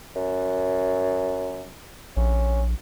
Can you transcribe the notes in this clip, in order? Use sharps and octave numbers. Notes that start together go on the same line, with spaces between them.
F#2
A#1 C#4